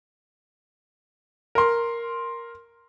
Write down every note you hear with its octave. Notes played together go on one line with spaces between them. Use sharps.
A#4 C6